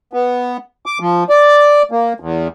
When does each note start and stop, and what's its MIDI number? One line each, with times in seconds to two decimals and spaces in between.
0.13 0.57 59
0.86 0.98 86
1.00 1.24 53
1.30 1.82 74
1.91 2.13 58
2.20 2.48 40